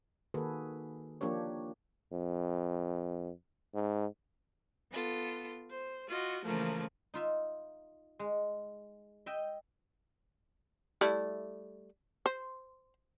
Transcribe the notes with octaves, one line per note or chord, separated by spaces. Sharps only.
D#3 A#3 F#4 G#4 A4 B4
F3 A#3 D4 G4 C#5
F2
G#2
B3 F4 A4
C5
F4 F#4 D#5
C#3 E3 F3 A3 A#3
D#4 F4 E5
G#3
D#5 E5 G5
G3 A3 E4
C5